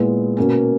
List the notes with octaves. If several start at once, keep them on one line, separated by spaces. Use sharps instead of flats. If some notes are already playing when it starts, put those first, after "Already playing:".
Already playing: A#2 G#3 B3 E4
B2 A#3 C#4